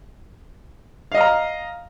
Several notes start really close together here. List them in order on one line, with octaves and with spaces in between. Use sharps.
F5 D#5 F6 A#5